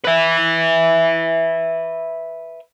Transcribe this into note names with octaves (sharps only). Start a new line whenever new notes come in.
B4 E5